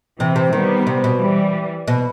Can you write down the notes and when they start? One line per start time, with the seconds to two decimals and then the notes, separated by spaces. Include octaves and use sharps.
0.20 C3 E3
0.36 C3
0.53 D#3 G3 B3
0.87 C3
1.04 B2
1.20 E3 G3
1.88 B2